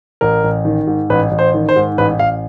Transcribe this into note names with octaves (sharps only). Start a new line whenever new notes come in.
A1 A#4
A1
D#3
G#2
A1 B4
A1
C5
D#3
C5
G#2
A1 B4
A1 F5